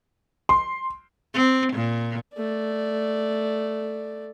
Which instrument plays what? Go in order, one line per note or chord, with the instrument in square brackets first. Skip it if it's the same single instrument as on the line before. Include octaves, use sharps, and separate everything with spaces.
[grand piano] C6
[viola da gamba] C4
A#2
[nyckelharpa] A3 D5